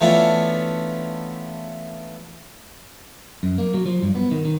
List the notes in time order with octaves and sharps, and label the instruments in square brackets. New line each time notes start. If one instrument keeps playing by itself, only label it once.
[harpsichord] E3 A3 B3 C#4 D4 F4
[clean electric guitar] F#2
A#3
F#3
F3
G2
B3
D#3
D#3